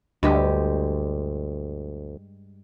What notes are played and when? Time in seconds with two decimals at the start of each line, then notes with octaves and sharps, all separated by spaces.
0.23 D2 G2 G#3 G4